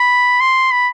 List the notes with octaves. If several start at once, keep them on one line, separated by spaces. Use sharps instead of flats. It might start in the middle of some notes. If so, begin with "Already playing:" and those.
Already playing: B5
C6
B5